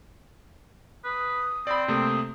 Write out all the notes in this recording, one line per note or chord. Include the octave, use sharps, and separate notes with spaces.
B4 D#6
C4 D5 B5
C3 A3 A#3 D#6